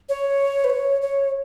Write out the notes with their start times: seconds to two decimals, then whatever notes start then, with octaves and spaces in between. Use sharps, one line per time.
0.09 C#5
0.64 B4
0.70 C#5
1.02 C#5